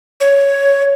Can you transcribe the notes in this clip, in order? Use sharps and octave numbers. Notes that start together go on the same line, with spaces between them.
C#5